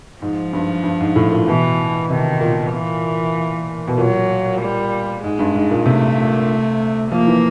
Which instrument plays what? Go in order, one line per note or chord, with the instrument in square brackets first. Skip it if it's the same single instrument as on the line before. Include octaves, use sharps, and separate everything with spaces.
[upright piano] G#2 [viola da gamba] F3
[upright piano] G2
G2
G#2
A2
A#2
[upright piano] B2 [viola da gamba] E3
[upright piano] C3 [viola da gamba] D#3
[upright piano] A#2
[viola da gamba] E3
[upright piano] B2
[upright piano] A#2 [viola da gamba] F#3
[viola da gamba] G3
[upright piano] G#2 [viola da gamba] G#3
[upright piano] G2
G#2
A#2
[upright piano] C3 [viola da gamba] A3
[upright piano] F3 [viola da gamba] A#3
[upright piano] E3